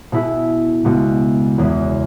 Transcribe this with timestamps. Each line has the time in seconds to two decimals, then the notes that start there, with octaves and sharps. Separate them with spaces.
0.12 B2 B3 E4 G#4
0.85 C#2 B2 B3 F#4
1.58 E2 C#3 E3